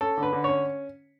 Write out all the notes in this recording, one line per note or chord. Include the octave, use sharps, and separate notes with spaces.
C#4 A4
D3
B4
D3
C#4 C#5